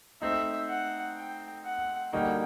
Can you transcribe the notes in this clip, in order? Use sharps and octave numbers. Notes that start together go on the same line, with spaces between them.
A3 C4 D#4 E5
F#5
G5
F#5
D3 G3 A#3 D#4 F#4 G5